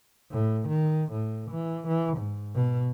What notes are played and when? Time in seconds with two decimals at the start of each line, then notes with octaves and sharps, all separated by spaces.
0.31 A2
0.68 D#3
1.11 A2
1.51 E3
1.88 E3
2.17 G#2
2.55 B2